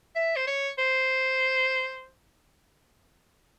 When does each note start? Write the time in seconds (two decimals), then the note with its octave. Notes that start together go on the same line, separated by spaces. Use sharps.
0.16 E5
0.36 C5
0.47 C#5
0.78 C5